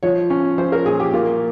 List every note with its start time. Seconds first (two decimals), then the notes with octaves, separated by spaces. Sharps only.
0.03 F3 C#5
0.30 C#4
0.58 F3 C5
0.72 A#4
0.86 A#2 G#4
1.00 G4
1.13 A#3 F4